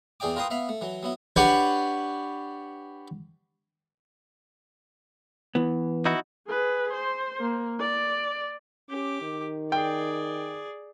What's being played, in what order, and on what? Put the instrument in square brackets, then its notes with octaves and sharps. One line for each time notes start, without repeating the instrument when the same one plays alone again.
[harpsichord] E2 E3 G#4 D5 G5 D6
F4 A#4 B4 G5 C6 D#6
B3 E5 F5 B5
A3
E3 F#3
F#3 B3 E4
D4 G4 B4 C#5 F#5
[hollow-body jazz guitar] E3 B3
[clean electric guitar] D#4 E4 F#4
[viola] G#4 B4
C5
A#3
D5
[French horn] C#4 [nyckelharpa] G4 D6
[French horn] D#3
[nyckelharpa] G#4 D5 [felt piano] G5